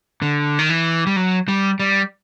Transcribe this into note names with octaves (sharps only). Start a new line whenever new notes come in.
D3
D#3
E3
G3
F#3
G3
G3